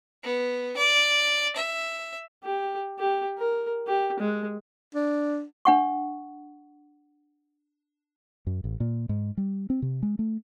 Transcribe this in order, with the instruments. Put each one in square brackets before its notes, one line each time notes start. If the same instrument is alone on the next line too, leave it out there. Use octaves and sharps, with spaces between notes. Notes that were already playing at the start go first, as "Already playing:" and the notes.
[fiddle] B3
D5
E5
[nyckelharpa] G4
G4
A#4
G4
G#3
[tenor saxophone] D4
[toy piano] D4 F#5 C#6
[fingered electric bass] F#2
A1
A#2
G#2
G3
C4
C3
G#3
A3